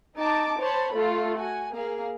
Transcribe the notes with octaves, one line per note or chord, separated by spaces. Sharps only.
D#4 A5 D6
C5 C#5 A5 B5
A3 F4 A4
F#4 G#5
A#3 G#4 F5